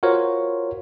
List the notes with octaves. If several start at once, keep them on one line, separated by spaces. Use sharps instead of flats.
F4 F#4 A#4 C5 C#5 F5